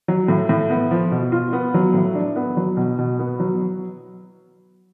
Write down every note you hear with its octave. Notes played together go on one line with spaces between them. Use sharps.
F#3
A2
A2
B3
F3
B2
F4
B3
F#3
A2
D4
B3
F#3
B2
B2
B3
F#3